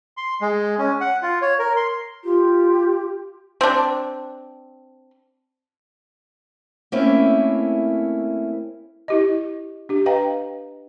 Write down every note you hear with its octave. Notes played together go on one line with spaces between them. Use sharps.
C6
G#3
C#4
F#5
F4
C#5
A#4
C6
F4 G4
C4 D4
A3 A#3 C4 C#4 E4
E4 G4 D#5
D4 G4
B4 D#5 F5 G5 A#5